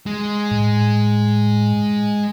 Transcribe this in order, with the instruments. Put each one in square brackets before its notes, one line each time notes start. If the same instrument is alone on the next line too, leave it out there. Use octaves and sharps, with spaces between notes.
[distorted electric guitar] G#3
[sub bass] A2